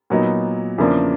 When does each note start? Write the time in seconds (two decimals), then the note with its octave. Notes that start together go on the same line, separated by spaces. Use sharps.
0.10 A#2 F#3 B3 D#4
0.78 E2 C#3 F3 A#3 D4